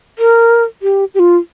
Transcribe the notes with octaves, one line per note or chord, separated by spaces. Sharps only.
A#4
G4
G4
F4